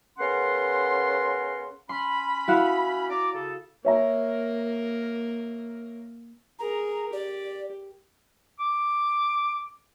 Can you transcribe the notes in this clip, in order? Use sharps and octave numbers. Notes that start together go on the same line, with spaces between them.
C#3 B3 C#4 A#4 F#5 C6
C#4 B5 C6
E4 F#4 F5
D5 A#5 D6
C#3 A4
A#3 A#4 C#5 E5 A#5
G#4 A#4 A#5
G4 D5
D6